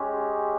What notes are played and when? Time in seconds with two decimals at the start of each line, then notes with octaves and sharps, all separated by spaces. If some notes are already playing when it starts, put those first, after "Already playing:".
Already playing: G#3 C#4 G4